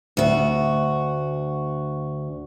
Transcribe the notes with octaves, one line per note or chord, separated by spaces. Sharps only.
D2 F#4